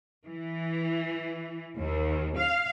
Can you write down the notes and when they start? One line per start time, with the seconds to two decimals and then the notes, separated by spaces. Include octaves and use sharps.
0.27 E3
1.77 D#2
2.37 F5